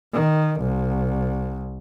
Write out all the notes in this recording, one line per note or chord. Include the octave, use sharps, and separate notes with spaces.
D#3
C2